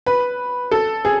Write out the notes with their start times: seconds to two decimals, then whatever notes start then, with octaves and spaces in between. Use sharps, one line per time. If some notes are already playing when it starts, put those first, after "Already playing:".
0.06 B4
0.71 A4
1.05 G#4